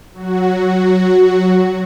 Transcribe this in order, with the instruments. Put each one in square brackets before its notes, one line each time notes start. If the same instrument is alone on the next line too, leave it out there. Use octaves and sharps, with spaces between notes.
[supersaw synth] F#3 F#4